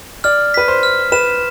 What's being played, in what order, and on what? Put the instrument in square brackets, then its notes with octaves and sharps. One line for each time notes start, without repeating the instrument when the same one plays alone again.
[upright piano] D5 [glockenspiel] F6
[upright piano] B4 [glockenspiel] B6
[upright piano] C5
[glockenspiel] F6
[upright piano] B4 [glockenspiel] E7